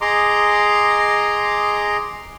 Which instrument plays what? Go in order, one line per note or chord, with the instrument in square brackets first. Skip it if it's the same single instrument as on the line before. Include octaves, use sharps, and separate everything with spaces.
[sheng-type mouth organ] G#4 D#5 A#5 C6 D6